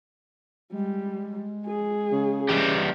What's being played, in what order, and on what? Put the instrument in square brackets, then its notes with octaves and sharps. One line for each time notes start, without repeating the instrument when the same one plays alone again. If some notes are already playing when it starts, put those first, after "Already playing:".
[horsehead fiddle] G3 [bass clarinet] G#3
[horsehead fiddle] G#4
[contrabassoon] C#3
[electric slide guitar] E3 G3 G4